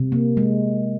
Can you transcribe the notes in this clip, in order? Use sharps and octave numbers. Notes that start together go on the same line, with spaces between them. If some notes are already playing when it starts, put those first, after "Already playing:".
Already playing: C3
A#3
G#3